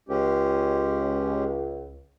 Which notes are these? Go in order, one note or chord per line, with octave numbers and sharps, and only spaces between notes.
C#2 G#3 C#4 G4